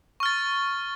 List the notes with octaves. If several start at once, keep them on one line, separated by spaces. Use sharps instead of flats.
C#6 F6 A6